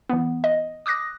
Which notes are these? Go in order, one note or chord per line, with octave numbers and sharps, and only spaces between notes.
E3 B3
D#5
D6 D#6 F#6 A#6